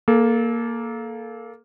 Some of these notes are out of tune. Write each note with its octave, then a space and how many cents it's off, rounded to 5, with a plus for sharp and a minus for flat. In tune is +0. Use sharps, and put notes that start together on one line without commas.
A#3 +0 A4 -25